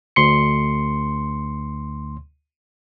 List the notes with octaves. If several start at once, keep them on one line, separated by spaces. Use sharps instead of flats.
D2 C6 C#7